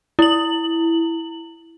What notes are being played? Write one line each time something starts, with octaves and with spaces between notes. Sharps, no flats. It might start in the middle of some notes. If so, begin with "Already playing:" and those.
E4 F#7